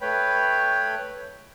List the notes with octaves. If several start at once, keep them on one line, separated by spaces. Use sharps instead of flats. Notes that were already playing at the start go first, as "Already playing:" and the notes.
A3 B4 C#5 G5 B5